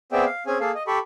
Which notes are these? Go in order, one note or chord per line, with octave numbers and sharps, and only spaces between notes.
B3 C4 G#4 D5 E5 G5
F5
C4 C#4 G#4 G#5
A#3 G#4 A4 F5
D#5
G4 A4 B5 C#6